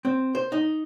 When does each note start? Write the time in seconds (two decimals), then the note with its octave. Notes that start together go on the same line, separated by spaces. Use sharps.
0.05 C4
0.35 C5
0.52 D#4